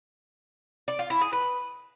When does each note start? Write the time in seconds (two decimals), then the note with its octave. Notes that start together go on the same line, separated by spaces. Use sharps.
0.88 D5
0.99 F4
1.10 E4
1.21 G#4
1.32 B4